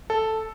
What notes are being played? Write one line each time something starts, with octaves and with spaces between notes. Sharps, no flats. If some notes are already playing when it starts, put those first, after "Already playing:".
A4